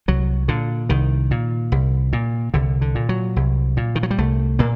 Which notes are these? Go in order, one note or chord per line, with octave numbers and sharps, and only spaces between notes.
C2 F#3
A#2 D3
C2 D#3
A#2
C2
A#2
C2 D3
D3
A#2
F#3
C2
A#2
D#3
F#3
G3
C2 A3
A#2 A#3